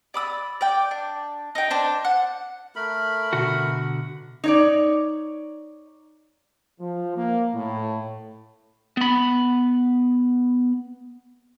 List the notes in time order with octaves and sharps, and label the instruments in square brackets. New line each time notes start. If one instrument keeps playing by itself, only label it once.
[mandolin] D5 B5 D#6 E6
D5 G5
D4
D#4 G5
D4 C5
F#5
[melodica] A3 A#4 B5
[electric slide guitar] B2 D3 F#4
[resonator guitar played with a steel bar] D#4 C#5 D5
[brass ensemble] F3
A#3
A2
[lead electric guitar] B3 B5